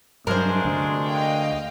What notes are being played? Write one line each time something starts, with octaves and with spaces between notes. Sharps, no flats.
G2 F#3 G#3 D4 A#4 C5
D2 C3
D#5 F5 G5